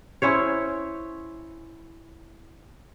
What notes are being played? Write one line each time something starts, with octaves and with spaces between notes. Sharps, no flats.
C#4 E4 C5 C#5